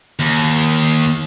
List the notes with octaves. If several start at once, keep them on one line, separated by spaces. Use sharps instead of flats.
D#2